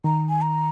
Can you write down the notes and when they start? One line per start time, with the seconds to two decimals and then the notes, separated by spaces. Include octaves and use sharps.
0.04 D#3 A#5
0.29 G#5
0.42 A#5